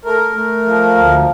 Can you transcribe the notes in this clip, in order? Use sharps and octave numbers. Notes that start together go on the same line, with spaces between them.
A3 A#4
A3
F3
D2